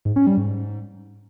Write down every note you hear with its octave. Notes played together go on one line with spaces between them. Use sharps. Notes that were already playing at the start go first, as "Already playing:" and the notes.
G#2
C#4
G3
G#2